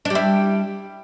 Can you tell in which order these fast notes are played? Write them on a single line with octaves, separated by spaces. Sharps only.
D4 G3 E4